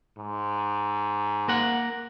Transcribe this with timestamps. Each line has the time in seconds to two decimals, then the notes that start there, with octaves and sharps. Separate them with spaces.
0.17 G#2
1.48 A#3 A#4 F#5